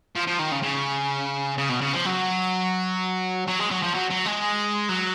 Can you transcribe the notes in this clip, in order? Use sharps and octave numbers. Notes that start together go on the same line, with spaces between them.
F3
F3
D#3
C#3
C#3
C#3
B2
C#3
F3
F#3
F#3
G#3
F#3
F3
F#3
F#3
G#3
F#3